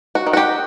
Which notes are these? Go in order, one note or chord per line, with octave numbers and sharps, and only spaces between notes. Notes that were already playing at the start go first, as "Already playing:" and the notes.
F#4
D#3
F#4
G4